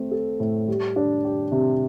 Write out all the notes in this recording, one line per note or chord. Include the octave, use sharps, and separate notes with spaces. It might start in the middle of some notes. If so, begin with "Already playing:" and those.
Already playing: A3 C4
A4
A2
G3
D4
G4
C3